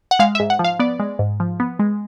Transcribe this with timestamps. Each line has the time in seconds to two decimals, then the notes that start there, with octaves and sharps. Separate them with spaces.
0.11 F#5
0.19 G#3 F5
0.35 E5
0.40 G#2
0.50 F#5
0.59 F3
0.64 F5
0.79 B3 D5
1.00 G#3
1.19 G#2
1.40 F3
1.60 B3
1.79 G#3